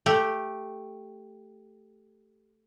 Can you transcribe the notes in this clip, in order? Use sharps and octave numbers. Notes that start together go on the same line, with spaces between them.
A3 G4